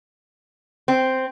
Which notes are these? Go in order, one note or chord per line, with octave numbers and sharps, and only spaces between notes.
C4